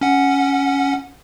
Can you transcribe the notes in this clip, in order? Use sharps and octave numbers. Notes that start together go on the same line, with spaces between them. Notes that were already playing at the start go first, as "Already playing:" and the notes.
C#4 F#5